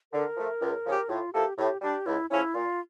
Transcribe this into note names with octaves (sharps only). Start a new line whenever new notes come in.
D3 A#4
F3 A3
C#2
C#3 F3 C#4 G4
A2 F4
F3 A#3 E4 G4 A4
A2 G4
G3 D4 G4
C#2 E4
C#3 F3 A3 C#4 E4
A#2 F4